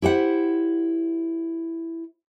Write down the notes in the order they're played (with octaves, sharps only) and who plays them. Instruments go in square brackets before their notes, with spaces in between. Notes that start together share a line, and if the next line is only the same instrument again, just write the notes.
[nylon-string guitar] E4 G4 C5 F#5